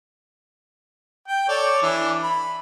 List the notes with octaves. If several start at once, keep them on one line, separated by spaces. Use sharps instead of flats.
G5
A4 C#5 D5
E3 D4
B5